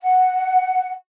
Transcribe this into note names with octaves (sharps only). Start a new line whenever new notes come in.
F#5